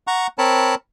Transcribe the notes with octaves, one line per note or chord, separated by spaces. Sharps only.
F#5 A#5 C#6
C4 A#4 C#5 A5 B5